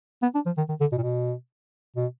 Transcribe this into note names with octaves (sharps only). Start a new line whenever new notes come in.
B3
D4
F3
D#3
D#3
D3
B2
A#2
B2
B2